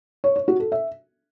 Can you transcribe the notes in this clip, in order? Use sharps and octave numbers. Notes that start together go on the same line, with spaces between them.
C#5
C#5
F#4
A4
E5